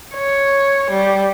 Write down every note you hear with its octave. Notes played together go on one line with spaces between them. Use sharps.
C#5
G3